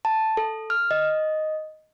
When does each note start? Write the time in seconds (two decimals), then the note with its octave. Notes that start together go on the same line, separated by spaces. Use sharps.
0.05 A5
0.37 A4
0.70 F6
0.91 D#5